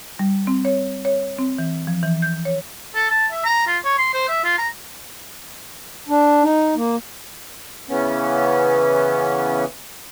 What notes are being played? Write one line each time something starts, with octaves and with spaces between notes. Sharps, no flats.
G3
C4
C#5
C#5
C4
E3
F3
E3
G6
C#5
A4
A5
E5
A#5
F4
C#5
C6
C5
E5
F4
A#5
D4
D#4
A#3
C#3 E3 B3 C#4